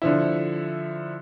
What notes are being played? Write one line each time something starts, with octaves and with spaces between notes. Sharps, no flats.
D3 F3 E4